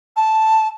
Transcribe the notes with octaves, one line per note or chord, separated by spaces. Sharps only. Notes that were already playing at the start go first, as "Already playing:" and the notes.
A5